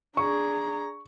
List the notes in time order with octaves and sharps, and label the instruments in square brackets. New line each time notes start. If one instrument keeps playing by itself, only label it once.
[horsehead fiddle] D4 G#4 [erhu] A#5 [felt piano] C#6